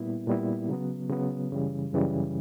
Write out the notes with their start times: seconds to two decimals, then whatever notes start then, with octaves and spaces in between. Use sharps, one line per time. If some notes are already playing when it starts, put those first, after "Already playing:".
Already playing: A#2 G3 B3 E4
0.27 A#2 G3 B3 E4
0.69 C#3 F#3 B3
1.09 C#3 F#3 B3
1.51 F#2 C#3 E3 G3
1.93 F#2 C#3 E3 G3